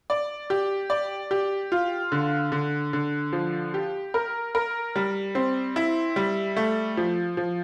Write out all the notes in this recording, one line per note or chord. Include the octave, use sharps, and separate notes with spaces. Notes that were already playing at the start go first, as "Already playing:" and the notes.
D5
G4
D5
G4
F4
D3
D3
D3
F3
G4
A#4
A#4
G3
C4
E4
G3
A3
F3
F3